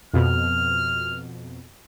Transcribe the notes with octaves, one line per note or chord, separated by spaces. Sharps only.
F2 B2 F6